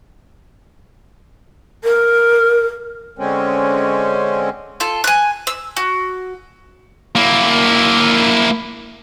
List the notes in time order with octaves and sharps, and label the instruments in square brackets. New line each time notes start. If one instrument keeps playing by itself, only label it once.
[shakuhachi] A#4
[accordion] D3 G#3 C4 C#4
[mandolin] F4 A4
G#5 F#6
E6
F#4
[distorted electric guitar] A#3 E4